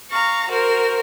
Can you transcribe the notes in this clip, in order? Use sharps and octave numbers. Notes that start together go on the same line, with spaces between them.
F5 A#5 C#6
F#4 A#4 C5